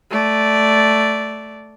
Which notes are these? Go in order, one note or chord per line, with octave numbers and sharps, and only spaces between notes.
A3 D5